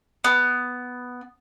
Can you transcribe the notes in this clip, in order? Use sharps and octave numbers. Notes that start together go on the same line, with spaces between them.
B3